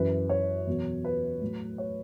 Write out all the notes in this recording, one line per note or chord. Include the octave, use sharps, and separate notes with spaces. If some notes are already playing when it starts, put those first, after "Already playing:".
Already playing: F#2 E3 B4
C#5
E2 B2 F#3
B4
A2 F#3
C#5